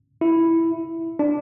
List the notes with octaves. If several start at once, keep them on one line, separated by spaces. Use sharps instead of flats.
E4
D4